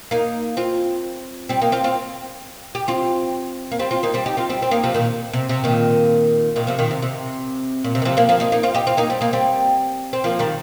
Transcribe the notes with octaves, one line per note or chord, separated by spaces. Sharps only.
A#3 D#4
C4 F4
G3 C4
A#3 D#4
C4 F4
C4 F4
G4
C4 F4
A#3
G3 C4
C4 F4
A#3 D#4
G3 C4
D#4 G4
C4 F4
G3 C4
C4
A#3 D#4
C3 F3
A#2 D#3
C3
C3
A#2 D#3
A#2 D#3
C3 F3
A#2 D#3
C3
C3
A#2
C3
D#3
C3 F3
F3 A#3
F3 A#3
A#3 D#4
A#3 D#4
C4 F4
D#4 G4
C4 F4
A#3 D#4
G3 C4
A#3 D#4
G3 C4
C4
F3 A#3
D#3 G3